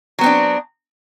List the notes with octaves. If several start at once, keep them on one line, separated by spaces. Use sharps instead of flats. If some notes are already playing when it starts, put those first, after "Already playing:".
F#3 B3 C4 D4